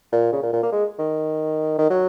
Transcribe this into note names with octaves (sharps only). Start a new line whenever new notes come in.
A#2
C#3
A#2
A#2
A#3
G#3
D#3
D#3
F#3